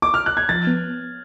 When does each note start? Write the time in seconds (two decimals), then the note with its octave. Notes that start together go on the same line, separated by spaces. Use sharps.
0.02 D6
0.14 F6
0.26 F#6
0.37 G#6
0.49 F3 A6
0.67 B3